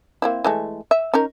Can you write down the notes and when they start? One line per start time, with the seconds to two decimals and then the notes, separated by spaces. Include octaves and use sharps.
0.22 A#3 C4 E4
0.44 E3 G#3 A3
0.91 E5
1.14 C#4 D#4 A#4